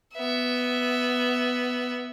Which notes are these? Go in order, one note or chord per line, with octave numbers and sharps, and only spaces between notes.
B3 E5